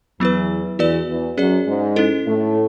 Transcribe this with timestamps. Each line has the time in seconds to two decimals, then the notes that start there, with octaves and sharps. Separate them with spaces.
0.20 E2 E3 F#3 B3 E4 B4
0.79 E2 E3 B3 F#4 B4 D5
1.08 E2 E3
1.37 F#2 F#3 C#4 G#4 D5
1.67 G#2 G#3
1.96 C#4 E4 A4
2.26 A2 A3